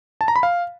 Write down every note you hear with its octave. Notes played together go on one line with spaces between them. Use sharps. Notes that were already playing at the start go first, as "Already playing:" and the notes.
A5
A#5
B5
F5